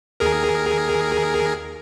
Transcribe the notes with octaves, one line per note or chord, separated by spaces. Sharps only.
D#2 G#4 A#4